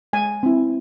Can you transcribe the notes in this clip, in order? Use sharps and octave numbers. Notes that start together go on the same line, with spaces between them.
G#3 G#5
C4 E4